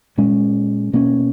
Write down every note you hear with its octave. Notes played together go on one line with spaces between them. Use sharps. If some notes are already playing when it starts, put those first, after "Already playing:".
A#2 G#3 C#4
B2 A#3 C#4